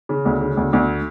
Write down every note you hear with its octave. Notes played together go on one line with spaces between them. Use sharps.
C#3
D2
C#3
D2
D2